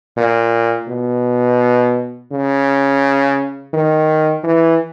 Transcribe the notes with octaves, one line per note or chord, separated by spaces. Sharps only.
A#2
B2
C#3
D#3
E3